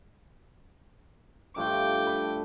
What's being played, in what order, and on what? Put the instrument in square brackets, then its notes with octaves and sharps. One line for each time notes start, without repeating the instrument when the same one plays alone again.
[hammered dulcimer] G2 F3 A3 [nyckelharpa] G5 D6
[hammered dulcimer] A4 B4 A5